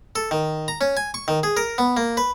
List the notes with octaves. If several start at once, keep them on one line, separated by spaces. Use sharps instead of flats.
A4
D#3
A#5
C#4
G#5
C#6
D#3
G#4
A#4
B3
A#3
B4